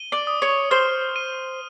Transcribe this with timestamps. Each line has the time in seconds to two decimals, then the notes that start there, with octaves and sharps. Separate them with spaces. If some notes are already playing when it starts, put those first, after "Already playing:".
Already playing: D#7 G7
0.12 D5
0.27 D#6
0.42 C#5
0.71 C5 F6
1.16 D#7